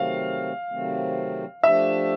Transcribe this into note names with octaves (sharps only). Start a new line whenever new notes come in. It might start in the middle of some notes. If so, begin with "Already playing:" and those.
Already playing: C3 D#3 F#3 A3 C4 F5
C3 D#3 F#3 A3 C4
F3 A3 D4 G4 E5